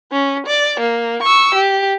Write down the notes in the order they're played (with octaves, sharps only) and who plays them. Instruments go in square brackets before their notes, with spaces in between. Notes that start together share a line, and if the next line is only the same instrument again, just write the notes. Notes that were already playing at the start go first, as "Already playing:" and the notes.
[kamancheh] C#4
D5
A#3
C#6 E6
G4